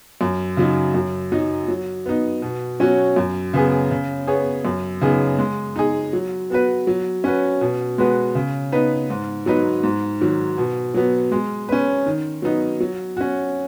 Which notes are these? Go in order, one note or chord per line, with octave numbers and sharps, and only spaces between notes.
F#2
C#3 F#3 D#4
F#2
F#3 D#4
F#3
B3 D#4
B2
F#3 C#4 F#4 C#5
F#2
C#3 B3 G#4
C#3
B3 G#4 C#5
F#2
C#3 B3 D#4 G#4
G#3
D#4 G#4
F#3
B3 F#4 B4
F#3
C#4 F#4 B4
B2
G#3 B3 F#4 B4
C#3
B3 D#4 B4
G#2
F#3 D#4 B4
G#2
D#3 F#3
B2
F#3 B3
G#3
C#4 B4
D#3
F#3 B3 D#4
F#3
C#4 F#4